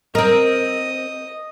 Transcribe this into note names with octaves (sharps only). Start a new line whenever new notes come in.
C4 A#4 D#5